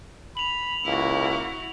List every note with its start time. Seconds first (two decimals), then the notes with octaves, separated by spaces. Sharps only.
0.37 B5 F7 F#7
0.85 C#2 A#3 E4 F#4